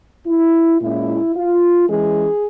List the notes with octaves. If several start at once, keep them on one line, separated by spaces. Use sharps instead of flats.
E4
A#2 G#3 C#4 E4
F4
E3 G#3 C#4 G#4